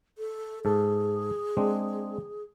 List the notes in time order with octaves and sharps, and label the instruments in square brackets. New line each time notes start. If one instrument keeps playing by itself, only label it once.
[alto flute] A4
[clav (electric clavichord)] G#2 A4 [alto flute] G#4
[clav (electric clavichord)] G#3 C4 D4